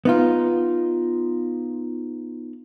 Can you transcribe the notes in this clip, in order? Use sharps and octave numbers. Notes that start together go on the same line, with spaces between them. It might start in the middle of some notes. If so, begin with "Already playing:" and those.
B3 D#4 F4